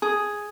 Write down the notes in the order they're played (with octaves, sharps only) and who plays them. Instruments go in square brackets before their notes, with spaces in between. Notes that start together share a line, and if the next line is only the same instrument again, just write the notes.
[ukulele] G#4